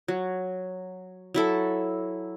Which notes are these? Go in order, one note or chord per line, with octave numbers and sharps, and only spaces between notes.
F#3
F#3 E4 A4